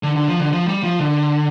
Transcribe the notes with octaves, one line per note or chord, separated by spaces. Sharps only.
D3
D3
F3
D3
F3
G3
F3
D3